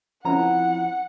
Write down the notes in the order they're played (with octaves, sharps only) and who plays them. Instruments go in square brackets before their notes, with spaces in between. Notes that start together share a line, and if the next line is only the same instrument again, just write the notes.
[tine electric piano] F3 C4 E4 [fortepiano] C#4 A#5 [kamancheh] F#5